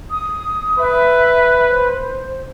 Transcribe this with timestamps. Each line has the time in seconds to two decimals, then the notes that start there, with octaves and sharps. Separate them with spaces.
0.10 D#6
0.79 B4 E5
1.70 C5